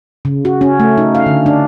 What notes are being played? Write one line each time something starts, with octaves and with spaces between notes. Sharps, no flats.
C#3
F#4
C#4
A3
D#4
F5
D3
D4